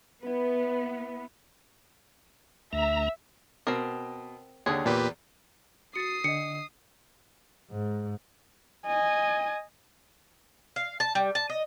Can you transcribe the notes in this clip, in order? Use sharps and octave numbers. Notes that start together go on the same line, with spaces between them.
B3 E4 B4
D2 E5 A#5
B2 C4 A#4
D#2 D3 G#4 C#5
E2 A#2 G4 B4
F#4 D#6 A6 C7 C#7 D#7
D3 D4 D#5 C#7
G#2
D#5 G#5
F5
A5
G3
A5
D#5